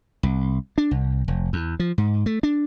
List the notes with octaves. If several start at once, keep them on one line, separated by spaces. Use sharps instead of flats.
C2
D4
C2
F1
E2
F3
G#2
A3
D4